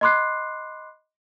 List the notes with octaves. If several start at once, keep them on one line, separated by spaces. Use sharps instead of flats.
D#5 B5 C6 D6 F#6 C7